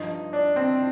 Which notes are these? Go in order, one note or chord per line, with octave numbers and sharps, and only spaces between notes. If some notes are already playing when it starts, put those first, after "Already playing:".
Already playing: G2 F3 D#4
D4
C4